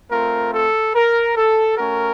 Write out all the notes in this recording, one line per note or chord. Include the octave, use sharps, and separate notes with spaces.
A3 C4 F4 A#4
A4
A#4
A4
A3 C#4 F#4 A#4